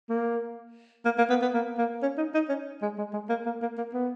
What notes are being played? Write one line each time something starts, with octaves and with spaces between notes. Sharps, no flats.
A#3
A#3
A#3
B3
B3
A#3
A#3
C#4
D#4
D#4
C#4
G#3
G#3
G#3
A#3
A#3
A#3
A#3
B3